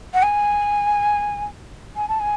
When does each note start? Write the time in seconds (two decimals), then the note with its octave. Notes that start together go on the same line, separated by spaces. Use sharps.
0.13 F#5
0.22 G#5
1.96 G#5
2.08 A5
2.20 G#5